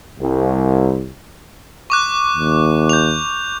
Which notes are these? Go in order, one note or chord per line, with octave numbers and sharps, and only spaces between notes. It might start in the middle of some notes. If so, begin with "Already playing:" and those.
C2
C#6 D6 F#6
D#2
G6 F7